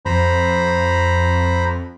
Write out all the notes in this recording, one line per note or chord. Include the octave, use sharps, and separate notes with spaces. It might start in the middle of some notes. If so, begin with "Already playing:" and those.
F2 C5 A#5 B5